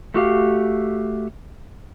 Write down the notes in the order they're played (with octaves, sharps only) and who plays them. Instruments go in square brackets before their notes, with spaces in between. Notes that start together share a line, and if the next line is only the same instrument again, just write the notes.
[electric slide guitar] A3 F#4 G4 F5